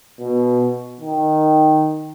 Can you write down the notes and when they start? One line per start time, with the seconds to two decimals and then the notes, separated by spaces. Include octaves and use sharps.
0.20 B2
1.01 D#3